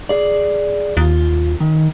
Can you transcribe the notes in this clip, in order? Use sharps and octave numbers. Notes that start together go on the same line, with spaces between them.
G#4 D5
D#2 F4
D#3